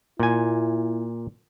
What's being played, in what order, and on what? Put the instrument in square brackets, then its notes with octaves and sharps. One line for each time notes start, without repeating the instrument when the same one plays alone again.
[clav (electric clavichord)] A#2 G#5 [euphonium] E4